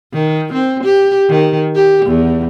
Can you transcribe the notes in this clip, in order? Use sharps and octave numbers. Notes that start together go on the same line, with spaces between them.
D#3
C4
G4
D#3
G4
E2